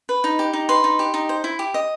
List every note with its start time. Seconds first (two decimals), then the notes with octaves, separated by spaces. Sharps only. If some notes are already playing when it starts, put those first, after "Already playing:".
0.09 B4
0.24 D#4
0.39 G4
0.53 D#4
0.69 B4 C6
0.84 D#4
0.99 G4
1.14 D#4
1.29 C5
1.44 E4
1.59 G4
1.74 D#5